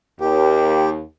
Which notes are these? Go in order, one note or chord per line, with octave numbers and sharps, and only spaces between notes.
D#2 G4